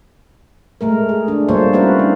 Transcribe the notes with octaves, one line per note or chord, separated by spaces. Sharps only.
G#3 A3 A#4
G#4
D4
G3 A#3 F4 A4 C5 C#5
C4 C#4 E4 F#4 A#4 B4
D4